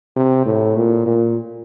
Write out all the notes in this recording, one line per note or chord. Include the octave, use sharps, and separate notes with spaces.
C3
A2
A#2
A#2